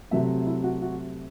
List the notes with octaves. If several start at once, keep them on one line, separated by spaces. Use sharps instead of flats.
C3 F#3 A3 E5
E4
F#4
F#4